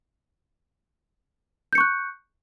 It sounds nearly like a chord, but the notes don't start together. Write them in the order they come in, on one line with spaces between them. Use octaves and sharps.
G6 C#7 C#6 F#6